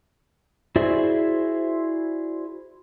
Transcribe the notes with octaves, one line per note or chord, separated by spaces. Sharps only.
E4 F#4 G#4 C5 D5 E5